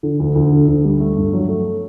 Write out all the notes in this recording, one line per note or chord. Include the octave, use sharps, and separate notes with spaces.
D3
D2
D2
D3
D2
G3
A3
G2
F#3
A3